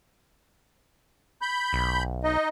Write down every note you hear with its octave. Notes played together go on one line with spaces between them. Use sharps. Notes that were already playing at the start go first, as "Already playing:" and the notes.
B5 G6
B1
D#4 D#5